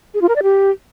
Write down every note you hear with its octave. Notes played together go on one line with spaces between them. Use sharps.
G#4
F4
A#4
D5
G4